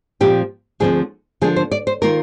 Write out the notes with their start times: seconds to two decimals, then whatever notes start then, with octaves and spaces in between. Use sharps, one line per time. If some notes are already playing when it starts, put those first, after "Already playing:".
0.20 A#2 F3 C4 G4
0.80 D2 D3 F3 C4 G#4
1.41 D3 F3 A#3 D4 G#4
1.56 C5
1.72 D5
1.87 C5
2.02 D#3 A#3 F4 A#4